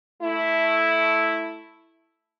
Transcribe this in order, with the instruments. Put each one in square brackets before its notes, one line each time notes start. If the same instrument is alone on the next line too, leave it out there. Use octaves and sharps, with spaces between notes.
[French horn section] A3 E4